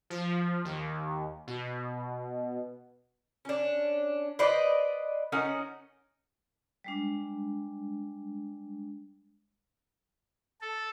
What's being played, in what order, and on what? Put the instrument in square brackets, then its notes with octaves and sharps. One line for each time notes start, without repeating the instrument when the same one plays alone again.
[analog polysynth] F3
D#2
B2
[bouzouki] C#4 D4
B4 C5 D5 D#5
C#4 D#4 A#4 F#5
[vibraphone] G3 G#3 D4
[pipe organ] A4